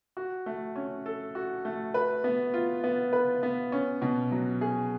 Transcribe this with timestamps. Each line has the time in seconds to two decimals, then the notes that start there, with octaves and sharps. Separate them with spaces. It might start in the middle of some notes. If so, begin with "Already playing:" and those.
0.17 F#4
0.46 A3
0.76 C#4
1.06 A4
1.35 F#4
1.65 A3
1.94 B4
2.24 B3
2.54 F4
2.84 B3
3.13 B4
3.43 B3
3.72 C#4
4.02 B2
4.32 F#3
4.61 G#4